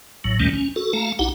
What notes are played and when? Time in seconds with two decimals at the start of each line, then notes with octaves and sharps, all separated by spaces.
0.24 A1 A2 F#3
0.40 D#2 A#2 D#3 G3 A3 C#4
0.54 C#4
0.76 F#4 A4
0.93 A3 F5 A5 A#5
1.19 A#1 D#4 E4 G4 F#5